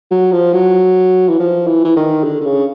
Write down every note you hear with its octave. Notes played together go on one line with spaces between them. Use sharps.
F#3
F3
F#3
E3
F3
E3
E3
D#3
D3
D3
C#3